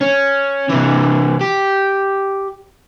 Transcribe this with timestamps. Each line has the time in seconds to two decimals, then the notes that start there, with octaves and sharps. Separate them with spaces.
0.01 C#4
0.69 C3 E3
1.41 G4